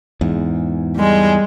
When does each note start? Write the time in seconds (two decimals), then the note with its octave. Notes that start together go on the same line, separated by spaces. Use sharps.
0.21 E2 G#2
0.97 G3 G#3